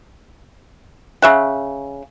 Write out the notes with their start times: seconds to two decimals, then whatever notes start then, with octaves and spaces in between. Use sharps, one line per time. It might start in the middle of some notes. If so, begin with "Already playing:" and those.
1.22 C#3 E5 F#5